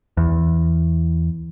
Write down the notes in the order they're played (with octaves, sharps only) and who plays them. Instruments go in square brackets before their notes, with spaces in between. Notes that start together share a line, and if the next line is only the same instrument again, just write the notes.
[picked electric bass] E2